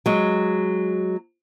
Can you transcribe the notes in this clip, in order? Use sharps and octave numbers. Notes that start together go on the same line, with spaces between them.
F#3 G#3